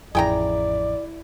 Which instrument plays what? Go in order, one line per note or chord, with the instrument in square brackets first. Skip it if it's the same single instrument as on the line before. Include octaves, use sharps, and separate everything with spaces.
[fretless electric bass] A1 F2 [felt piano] E4 [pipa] G#4 G5 A#5 [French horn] D5